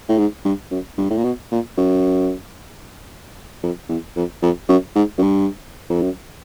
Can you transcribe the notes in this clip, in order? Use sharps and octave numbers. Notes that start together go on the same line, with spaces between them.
A2
G#2
G2
F#2
G2
A2
A#2
B2
A#2
F#2
F2
E2
F2
F2
F#2
G#2
F#2
G2
F2
F#2